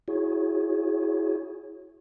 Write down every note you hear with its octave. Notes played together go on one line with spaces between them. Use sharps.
E4 F#4 G#4 C#5